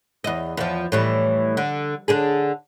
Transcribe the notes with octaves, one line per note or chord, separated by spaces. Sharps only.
E2 D#5
E2 F3
A2 E3 G3
D3
D3 D4 G#4